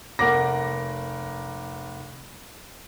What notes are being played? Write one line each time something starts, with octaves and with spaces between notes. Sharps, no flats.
F1 A#4 F#5 D6 A#6